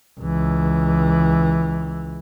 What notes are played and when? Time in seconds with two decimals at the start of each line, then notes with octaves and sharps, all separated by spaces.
0.20 C#2 E3